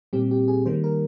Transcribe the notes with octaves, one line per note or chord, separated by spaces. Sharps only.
A#2 G3 C4 G4
G4
G#4
D#3 G3 A#3 C5
A#4